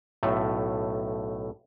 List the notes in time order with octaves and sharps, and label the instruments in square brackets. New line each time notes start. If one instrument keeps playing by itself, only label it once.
[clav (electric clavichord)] B1 A2 A3